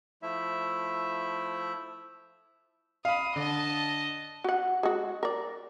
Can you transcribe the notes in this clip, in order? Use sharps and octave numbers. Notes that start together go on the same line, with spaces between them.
F3 A3 E4 E5
F5 B5 D#6
D3 D#5 A5
F#4 F#5
G#3 F#4
A#4 D5